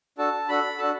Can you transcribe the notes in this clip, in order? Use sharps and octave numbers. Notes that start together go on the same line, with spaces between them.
D4 F#4 A4 A5
D4 F#4 A4 B5
D4 F#4 A4 A5